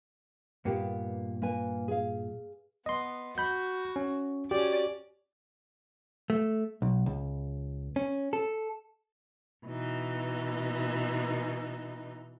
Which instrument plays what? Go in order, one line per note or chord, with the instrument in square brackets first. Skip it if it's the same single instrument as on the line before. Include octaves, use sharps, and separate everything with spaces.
[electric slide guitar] G2 A#2 [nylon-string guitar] A#3 B3 G4
[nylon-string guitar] A#3 B4 G#5
G#4 F5
[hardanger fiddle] B3 [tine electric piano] D#5 C6
[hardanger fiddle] F#4 [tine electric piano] B5 G6
[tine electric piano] C#4
[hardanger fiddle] C#4 D5 [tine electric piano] F#4 G4
[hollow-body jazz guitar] A3
B1
C#2
C#4
A4
[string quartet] B2 E3 D#4